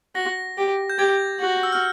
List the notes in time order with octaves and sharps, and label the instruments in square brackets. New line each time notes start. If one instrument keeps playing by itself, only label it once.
[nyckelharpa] F#4 [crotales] A#6
[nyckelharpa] G4
[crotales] G6
[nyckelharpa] G4 [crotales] G#6
[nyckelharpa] F#4
[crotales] E6
F6